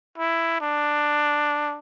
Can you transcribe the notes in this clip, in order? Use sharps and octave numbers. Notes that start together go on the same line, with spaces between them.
E4
D4